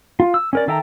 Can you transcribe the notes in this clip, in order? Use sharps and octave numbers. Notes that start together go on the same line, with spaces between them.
F4
E6
C#4 A#4 D5
D#3 A4 E5 G5 A#5